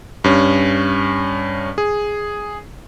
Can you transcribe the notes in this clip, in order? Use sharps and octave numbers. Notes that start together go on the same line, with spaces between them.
G2 C#4
G#4